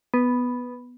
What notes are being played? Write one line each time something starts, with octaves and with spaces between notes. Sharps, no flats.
B3